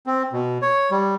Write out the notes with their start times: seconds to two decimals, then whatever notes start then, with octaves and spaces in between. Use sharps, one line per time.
0.07 C4
0.33 B2
0.62 C#5
0.91 G3